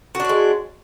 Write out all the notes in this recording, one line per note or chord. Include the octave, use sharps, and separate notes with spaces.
G#3 D4 F#4 C#5